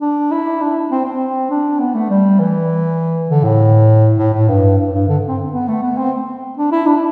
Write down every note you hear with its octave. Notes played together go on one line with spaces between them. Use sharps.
D4
E4
D4
C4
C4
D4
B3
A3
G3
E3
D3
A2
A2
A2
G2
G2
G2
D3
C4
B3
A3
B3
C4
D4
E4
D4